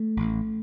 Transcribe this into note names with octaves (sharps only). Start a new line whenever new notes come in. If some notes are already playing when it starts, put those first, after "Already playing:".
Already playing: A3
A1